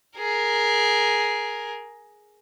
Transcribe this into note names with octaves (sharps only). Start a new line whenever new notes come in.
G#4 A#4